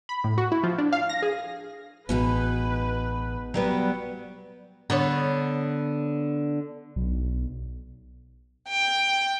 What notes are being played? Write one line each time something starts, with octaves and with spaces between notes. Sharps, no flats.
B5
A2
F#4
E4
F3
D4
F5
A#6
G#4
A1 B2 G#3 B3 D#4 B4
F#3 G3 B3
D3 B3 C#5
B1
G5